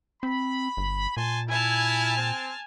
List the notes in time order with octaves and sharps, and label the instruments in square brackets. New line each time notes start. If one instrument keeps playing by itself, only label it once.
[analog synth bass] C4 [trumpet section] B5
[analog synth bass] G1
[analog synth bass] A#2 [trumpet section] G#5 A5 C6
[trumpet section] E4 [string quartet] G#5 A5 F6
[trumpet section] C4